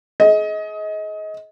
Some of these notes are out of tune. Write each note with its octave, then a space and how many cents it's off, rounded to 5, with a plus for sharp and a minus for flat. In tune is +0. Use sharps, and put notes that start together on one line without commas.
G#4 +35 D#5 +25